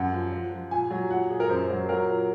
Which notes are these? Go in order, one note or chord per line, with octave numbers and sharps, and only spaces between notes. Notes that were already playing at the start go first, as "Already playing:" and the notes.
Already playing: F#2 F#5
F3
F3
F3
A#2 G#5
F#3
A#2 F#5
A#2 G#4
A#4
F#2 C5
F#3
F#3 A#4
A#2